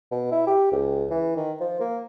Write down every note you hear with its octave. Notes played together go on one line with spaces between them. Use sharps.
B2
E4
G4
C#2
E3
D#3
F3
A#3